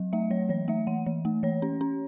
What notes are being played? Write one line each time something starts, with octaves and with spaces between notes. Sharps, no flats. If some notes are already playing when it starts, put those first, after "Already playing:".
Already playing: F#3
A3 E5
F#3 C#5
E3 C#5
A3 E5
E3 F#5
E3
A3
E3 C#5
C#4
C#4